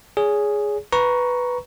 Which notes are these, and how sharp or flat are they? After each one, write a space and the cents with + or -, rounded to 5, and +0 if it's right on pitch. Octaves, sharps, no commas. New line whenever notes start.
G#4 +0 C#5 +35
B4 +0 A#5 +10 C#6 +0